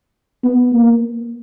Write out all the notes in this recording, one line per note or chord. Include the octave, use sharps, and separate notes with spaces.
B3
A#3